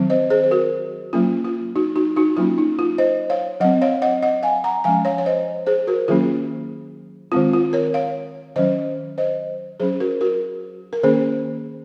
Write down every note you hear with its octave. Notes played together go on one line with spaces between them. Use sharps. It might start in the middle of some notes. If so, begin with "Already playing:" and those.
Already playing: D#3 F#3 C4
C5 D#5
G#4 C5
C5
F#4 A#4
F#3 A#3 C#4 F4
F4
D#4 F#4
D#4 F#4
D#4 F#4
F#3 A#3 C#4 F4
D#4
F4
C5 D#5
C#5 F5
F#3 C4 D#5 F#5
C#5 F5
D#5 F#5
D#5 F#5
F5 G#5
F#5 A#5
F3 G#3 C#4 F5 G#5
C#5 F5
C#5
C5 D#5
G#4 C5
F#4 A#4
D#3 F#3 A#3 C#4 F4 G#4
D#3 G#3 C4 F4
F4
A#4 C#5
C#5 F5
D#3 F#3 C#4 C5 D#5
C5 D#5
F#3 C#4 G#4 C5
F#4 A#4
F#4 A#4
A#4
D#3 A#3 C#4 G#4 C5